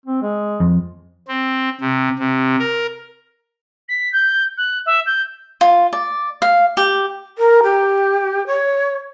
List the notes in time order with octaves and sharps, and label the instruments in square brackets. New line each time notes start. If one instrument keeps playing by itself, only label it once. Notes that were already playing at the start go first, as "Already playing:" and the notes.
[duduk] C4
G#3
[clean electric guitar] F2
[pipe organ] C4
C3
C3
A#4
[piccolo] B6
G6
F#6
E5
G6
[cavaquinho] F4
D5
F5
G4
[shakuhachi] A#4
G4
C#5